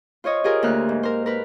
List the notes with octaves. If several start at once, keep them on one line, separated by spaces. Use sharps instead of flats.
F4 C5 C#5 D#5
F4 G4 G#4 A#4
D2 A#3 F6 F#6
G#2
A#4 C5
A#4 B4